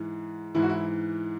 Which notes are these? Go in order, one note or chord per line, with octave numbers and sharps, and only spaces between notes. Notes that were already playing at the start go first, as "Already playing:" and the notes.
Already playing: G#2 E3
G#2 E3 E4
F#4
E4